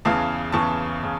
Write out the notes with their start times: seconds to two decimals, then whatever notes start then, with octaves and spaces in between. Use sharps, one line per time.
0.05 E2 C#3 E3 F5 A5
0.52 E2 C#3 E3 A5 C#6
1.03 C#3